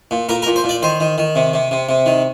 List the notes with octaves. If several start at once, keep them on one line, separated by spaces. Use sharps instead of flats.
A#2
A#2 A#4
A#4
A#2
C5
A#2
D5
D#3 C5
D#3
D#3
C3
C3
C3
C3
D#3